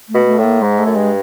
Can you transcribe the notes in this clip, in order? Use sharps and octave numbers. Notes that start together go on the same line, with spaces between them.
A3
B2
A3
A2
A#3
G#2 G#3
A3
F#2
G2 G#3